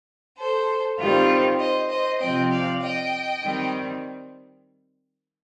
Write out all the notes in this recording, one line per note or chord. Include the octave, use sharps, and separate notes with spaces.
A4 C5
D#3 G3 C4 F4
C5 D#5
C5 D#5
C3 F3 C4 D#5 G5
D5 F5
D#5 G5
D#3 G3 C4